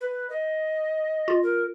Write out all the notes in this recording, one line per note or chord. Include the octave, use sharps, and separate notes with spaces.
B4
D#5
F4
A#4